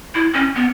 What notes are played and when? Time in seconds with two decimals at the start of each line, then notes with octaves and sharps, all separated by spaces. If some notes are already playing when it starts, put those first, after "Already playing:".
0.15 E4
0.34 C#4
0.56 B3